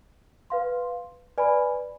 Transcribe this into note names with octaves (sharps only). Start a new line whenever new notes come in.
B4 F5 C6
B4 D5 G#5 B5